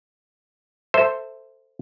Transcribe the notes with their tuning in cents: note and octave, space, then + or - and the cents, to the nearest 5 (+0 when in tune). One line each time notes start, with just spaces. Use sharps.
A4 +15 C5 +0 E5 +0